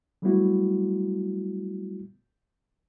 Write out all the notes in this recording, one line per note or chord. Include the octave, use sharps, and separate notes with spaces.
F#3 G3 A3 B3 E4 F#4